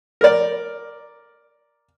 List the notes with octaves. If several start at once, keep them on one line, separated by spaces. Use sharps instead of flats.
A#4 D5